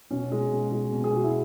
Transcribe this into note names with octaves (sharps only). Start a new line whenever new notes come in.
B2 C#4
G#3
B2
G#3
B2
G#4
G#3 F#4
E4